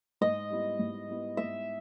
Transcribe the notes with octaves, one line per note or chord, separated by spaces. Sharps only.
G#2 D#5
G3 B3 E4
G#2
G3 B3 E4
G#2 E5